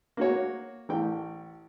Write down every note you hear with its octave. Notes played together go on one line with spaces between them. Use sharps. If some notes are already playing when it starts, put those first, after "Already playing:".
A#3 F#4 C#5
A1 G5